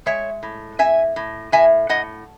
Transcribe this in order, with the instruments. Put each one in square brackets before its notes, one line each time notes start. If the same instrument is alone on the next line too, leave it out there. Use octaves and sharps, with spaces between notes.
[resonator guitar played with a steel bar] G#3 C#5 E5
A2
C4 E5 G#5
A2
A2 E5 G#5
A2 D#5 F#5